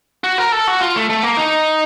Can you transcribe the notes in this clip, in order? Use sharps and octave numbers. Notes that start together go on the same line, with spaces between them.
F#4
A#4
A4
F#4
F4
A3
A3
A#3
D#4